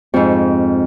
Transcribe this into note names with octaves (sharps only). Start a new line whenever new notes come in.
F2 G#2